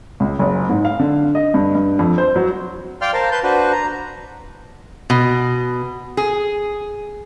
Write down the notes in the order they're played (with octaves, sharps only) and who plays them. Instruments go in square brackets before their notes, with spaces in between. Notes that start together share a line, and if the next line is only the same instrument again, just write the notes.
[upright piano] C#2
F#1
G#2
F5
D3
D#5
G2
G2
F2
C5
F#3
[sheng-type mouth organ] D5 F5 G5 C6 F6
A#4 C5 F5 A5
B4 A5 C6 G6
D4 F#4 B4 C5
A#5
[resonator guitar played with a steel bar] B2
G#4